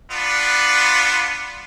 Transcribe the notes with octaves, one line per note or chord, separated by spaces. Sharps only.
B3 D4 F4